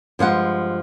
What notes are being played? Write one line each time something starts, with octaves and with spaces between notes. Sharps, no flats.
G2 F3 G#3 F#5